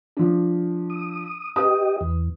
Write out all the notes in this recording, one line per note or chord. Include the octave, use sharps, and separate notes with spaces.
F3 D4
D#6
G4 B4 D#5 D#6
E2